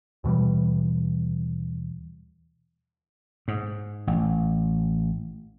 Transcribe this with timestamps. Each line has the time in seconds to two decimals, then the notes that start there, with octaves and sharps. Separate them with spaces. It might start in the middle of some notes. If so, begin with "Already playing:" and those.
0.24 D#2 B2 E3 G3
3.48 G#2
4.07 A1